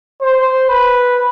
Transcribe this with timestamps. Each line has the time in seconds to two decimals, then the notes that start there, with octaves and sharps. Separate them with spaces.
0.22 C5
0.69 B4